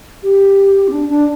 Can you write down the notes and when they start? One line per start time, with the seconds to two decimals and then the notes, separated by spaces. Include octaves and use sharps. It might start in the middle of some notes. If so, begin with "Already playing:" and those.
0.23 G4
0.88 C4
0.92 D4
1.10 D4